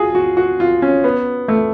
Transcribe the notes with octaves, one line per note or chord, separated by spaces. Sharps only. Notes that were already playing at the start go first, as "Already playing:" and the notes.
Already playing: F4 F#4 G#4
F#4
F#4
F4
C#4
B3
A3